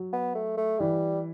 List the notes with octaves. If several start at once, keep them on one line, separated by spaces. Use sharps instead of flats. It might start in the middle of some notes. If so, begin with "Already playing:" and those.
Already playing: F#3
B3
A3
A3
E3 G3